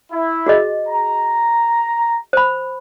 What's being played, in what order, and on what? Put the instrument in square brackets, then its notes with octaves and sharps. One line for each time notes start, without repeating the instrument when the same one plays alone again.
[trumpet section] E4
[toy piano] F#4 G#4 D#5
[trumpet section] A#5
[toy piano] C5 B5